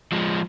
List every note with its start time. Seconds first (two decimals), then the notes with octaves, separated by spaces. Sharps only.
0.12 F3 G#3